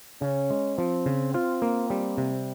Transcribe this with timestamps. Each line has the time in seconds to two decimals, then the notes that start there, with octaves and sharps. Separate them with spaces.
0.21 C#3 C#4
0.50 G#3
0.77 F3 C4
1.06 C#3
1.34 C4 F4
1.62 A#3
1.90 G3 C4
2.18 C3